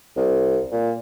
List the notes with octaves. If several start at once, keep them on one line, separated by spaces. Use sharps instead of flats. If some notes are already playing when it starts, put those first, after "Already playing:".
C2
A#2